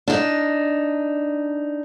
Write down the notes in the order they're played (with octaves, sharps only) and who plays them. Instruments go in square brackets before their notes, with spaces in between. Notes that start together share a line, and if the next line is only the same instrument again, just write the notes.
[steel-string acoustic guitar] D4 D#4